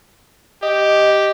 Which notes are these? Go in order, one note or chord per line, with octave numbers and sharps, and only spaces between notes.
G4 D#5